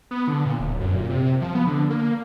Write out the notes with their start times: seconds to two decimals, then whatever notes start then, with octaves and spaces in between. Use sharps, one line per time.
0.11 B3
0.28 D3
0.45 A#2
0.60 D1
0.80 F#2
0.94 A#2
1.09 C3
1.41 F3
1.55 B3
1.66 D3
1.90 A#3